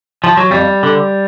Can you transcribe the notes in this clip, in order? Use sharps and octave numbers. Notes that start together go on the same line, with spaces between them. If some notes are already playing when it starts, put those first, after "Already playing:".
F3
F#3
F2 G3
D3